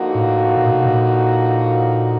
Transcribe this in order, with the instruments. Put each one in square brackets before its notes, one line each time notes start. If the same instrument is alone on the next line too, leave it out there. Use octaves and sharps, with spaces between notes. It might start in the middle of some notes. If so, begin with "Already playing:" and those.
Already playing: [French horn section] D3 F3 A#3 D#4 F#4
[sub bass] A2
A#2
B2
A#2